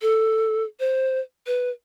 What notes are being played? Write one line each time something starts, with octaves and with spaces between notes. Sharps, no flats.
A4
C5
B4